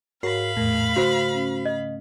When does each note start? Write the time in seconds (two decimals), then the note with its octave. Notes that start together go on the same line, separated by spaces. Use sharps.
0.23 G#2 F#4 A#4 C#5 F5 B5 C7
0.57 E2 A2 A3 A#4
0.96 C#3 F#4 C5
1.34 C#4
1.65 D#5